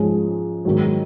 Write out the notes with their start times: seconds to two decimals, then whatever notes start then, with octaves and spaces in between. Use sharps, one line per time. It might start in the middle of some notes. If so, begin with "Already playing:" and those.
Already playing: G#2 F3 G#3 C#4
0.65 G#2 D#3 F#3